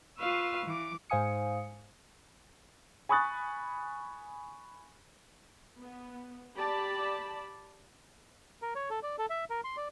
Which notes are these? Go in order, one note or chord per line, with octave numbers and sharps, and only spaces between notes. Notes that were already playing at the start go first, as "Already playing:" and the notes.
F4 B4 F5 C#6 E6
E3 D6
G#2 C5 F5 G#5 D#6 C#7
G#5 B5 C#6 D#6 F#6 A6
B3
G4 D5 A5 B5
A#4
C#5
A4
D5
A4
E5
A#4
C6
D5